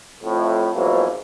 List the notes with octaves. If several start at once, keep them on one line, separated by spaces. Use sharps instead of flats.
F2 A2
F2 G#2 B2 E3 F#3 A#3